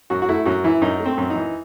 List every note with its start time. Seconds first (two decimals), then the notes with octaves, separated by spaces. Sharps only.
0.10 F#2 F#4
0.22 F#4
0.29 A3 E4
0.46 F#2 F#4
0.64 E3 E4
0.82 F#2 D#4
1.00 A3
1.06 C4
1.18 F#2
1.30 D#4
1.36 E3